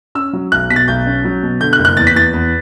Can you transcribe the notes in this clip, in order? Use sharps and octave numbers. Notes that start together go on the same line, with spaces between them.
C#4 E6
F#3
B1 F#6
B2 B6
A6
B1 G6
C#4
F#3
B2
D3 G6
F#6
F#1
F#6
E2 A6
B6
E2 A6
E2